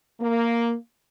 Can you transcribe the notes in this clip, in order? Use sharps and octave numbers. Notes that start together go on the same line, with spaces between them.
A#3